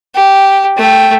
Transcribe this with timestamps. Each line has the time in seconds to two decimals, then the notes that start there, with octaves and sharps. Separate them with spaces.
0.15 G4
0.77 A3 G5